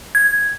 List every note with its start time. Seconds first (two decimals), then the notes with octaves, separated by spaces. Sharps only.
0.15 G#6